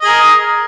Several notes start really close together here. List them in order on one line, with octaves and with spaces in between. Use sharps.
D#5 G#4 A#4